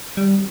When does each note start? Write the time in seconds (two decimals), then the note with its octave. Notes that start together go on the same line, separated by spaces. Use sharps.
0.16 D#3 F#3 G3 C4